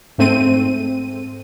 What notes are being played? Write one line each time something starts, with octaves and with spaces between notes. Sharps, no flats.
G#2 A3 C4 D#7